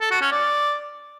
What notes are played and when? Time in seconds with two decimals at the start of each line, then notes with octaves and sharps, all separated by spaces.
0.01 A4
0.11 F#4
0.21 C#4
0.31 D5